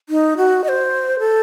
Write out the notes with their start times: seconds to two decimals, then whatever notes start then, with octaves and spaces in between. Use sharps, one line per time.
0.09 D#4
0.37 F#4
0.64 D#5
0.68 C5
1.19 A4